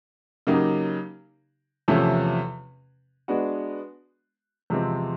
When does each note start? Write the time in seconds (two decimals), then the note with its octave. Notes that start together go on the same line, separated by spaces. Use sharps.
0.47 C#3 F#3 A#3 D#4 G4
1.88 E2 C3 F3 A3 C#4
3.28 G#3 B3 D4 F#4
4.70 E2 C3 F3 G#3 C4